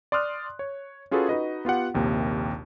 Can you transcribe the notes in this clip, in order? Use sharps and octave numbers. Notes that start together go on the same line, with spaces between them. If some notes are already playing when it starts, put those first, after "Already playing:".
D5 C6 D#6 F6 F#6
C#5
C#4 F4 F#4 G#4 A4 B4
D#4 F#4 B4 D#5
B3 F4 G4 F#5
A#1 D#2 C3 A#3